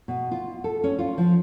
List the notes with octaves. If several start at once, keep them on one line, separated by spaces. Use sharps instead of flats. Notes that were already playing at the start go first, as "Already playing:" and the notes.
B2
F4
A4
C#4
F4
F3